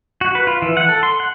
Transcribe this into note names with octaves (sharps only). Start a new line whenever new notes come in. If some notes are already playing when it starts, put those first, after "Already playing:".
F#4
B4
F4
E3
F#5
A4
C6
F#5